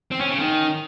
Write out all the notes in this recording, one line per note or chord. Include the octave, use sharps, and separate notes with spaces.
C4
C#4
C#3
D#3